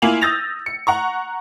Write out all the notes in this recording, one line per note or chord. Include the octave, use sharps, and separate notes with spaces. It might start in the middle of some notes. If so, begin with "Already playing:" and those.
A#3 E4 F4 G#5 F7 F#7
D#6 E6 G6 A6 A#6 F7
C#7
F#5 A#5 C#6